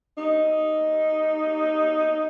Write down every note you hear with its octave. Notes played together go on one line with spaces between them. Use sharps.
D#4